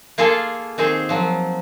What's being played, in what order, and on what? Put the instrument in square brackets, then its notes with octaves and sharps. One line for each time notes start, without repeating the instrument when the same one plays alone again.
[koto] A#3 F4 G#4 A4
D#3 C4 G#4 C5
F3 F#3